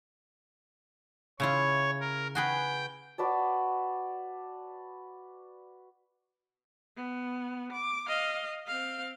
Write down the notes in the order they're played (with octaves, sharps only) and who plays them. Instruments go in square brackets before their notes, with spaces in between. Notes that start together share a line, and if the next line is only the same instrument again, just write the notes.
[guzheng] C#3 E4 F4 [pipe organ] C#5
[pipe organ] A#4
[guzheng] F#4 G#4 B4 [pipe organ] G5
[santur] F#4 B4 D5 A5
[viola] B3
D6
D#5 F5
C4 F5